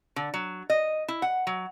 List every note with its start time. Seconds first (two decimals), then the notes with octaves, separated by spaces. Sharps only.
0.16 D3
0.34 F#3
0.70 D#5
1.08 E4
1.22 F#5
1.47 F#3